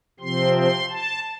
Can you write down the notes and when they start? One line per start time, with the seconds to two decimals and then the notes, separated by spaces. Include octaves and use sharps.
0.20 C3 F3 C4 C6
0.55 C6
0.89 A5